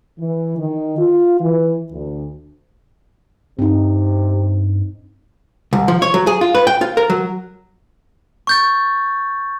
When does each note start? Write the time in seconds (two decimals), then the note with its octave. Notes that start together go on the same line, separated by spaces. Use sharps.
0.20 E3
0.59 D#3
0.99 F4
1.41 E3
1.92 D2
3.59 G2 C3 C4 D#4
5.73 C2
5.88 F3
6.02 C#5
6.14 F#3
6.27 G#4
6.41 F4
6.55 B4
6.67 G5
6.81 F4
6.97 A#4
7.10 F#3
8.47 C#6 G6 A6